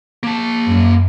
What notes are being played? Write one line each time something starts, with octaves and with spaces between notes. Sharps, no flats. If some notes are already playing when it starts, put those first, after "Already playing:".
A#3 A5
F#2